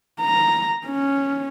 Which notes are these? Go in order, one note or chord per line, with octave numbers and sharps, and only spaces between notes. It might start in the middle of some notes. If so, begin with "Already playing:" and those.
A#5
C#4